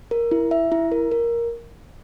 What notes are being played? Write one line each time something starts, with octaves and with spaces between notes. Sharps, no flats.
A#4
E4
E5
E4
A#4
A#4